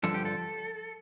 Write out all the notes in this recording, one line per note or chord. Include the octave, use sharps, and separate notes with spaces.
G2 D3 F3 A4
G4
A4